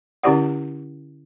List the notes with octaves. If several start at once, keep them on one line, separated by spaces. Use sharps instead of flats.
D3 C#4 E4 G4 D5 F#5